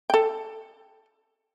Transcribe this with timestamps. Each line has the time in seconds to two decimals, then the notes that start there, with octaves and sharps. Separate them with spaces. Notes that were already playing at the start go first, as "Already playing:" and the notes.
0.10 A4 G5